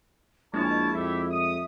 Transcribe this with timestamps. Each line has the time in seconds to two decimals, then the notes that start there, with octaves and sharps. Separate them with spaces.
0.54 A#1 G#3 E4 A#4 C#5 A5
0.94 F2 G4 A4 E5
1.32 E5 D#6